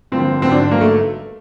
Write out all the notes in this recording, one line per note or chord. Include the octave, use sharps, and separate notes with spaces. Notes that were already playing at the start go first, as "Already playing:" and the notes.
G2 D3 F3 A#3 C4
G#1 G2 D3 F#3 B3 C4
D4
G#1 G2 D3 F#3 A#3 B3
A3